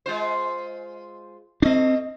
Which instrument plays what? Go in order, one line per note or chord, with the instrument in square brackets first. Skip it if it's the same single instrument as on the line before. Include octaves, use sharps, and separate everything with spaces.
[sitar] G#3 F4 C5
[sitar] A3 D#5 [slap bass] C4 D4